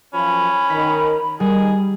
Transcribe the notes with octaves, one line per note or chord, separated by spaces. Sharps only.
F#2 F3 C#4 B5
D#3 B6
D#3 G3 G#4